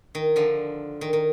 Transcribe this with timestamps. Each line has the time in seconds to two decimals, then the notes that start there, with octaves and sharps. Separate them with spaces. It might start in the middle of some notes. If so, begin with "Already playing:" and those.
0.15 D#3
0.36 D3 F3
1.01 D#3
1.13 D#3